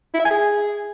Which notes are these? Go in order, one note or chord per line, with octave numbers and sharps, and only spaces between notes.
E4
E5
G#5
G#4